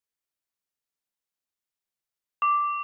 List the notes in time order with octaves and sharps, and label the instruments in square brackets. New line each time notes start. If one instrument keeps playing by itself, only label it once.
[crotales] D6